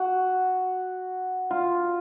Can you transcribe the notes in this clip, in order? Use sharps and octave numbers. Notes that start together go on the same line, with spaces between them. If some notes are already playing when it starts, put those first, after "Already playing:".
Already playing: F#4
F4